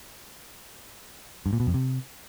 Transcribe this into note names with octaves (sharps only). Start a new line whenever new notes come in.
G2
A#2
B2
F2
C3